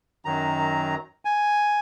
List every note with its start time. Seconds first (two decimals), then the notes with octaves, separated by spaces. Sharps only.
0.25 F#2 D#3 F#3 A#5
1.25 G#5